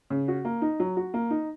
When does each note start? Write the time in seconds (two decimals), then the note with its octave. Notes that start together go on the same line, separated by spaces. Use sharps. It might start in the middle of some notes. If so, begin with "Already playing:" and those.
0.10 C#3
0.28 F#4
0.45 A#3
0.62 D#4
0.80 F#3
0.97 F#4
1.14 A#3
1.31 D#4